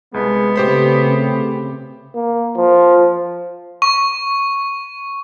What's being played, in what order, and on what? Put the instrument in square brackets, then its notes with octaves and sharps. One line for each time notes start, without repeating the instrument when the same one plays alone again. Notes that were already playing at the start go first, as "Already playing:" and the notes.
[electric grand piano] C2 [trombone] G#3 [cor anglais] B3
[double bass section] C#3 C4 [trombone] A3 [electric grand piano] G4 C5 B5
[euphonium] A#3
F3
[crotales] C#6